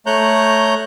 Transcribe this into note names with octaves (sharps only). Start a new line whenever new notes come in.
A3 C#5 A#5 F#6 G6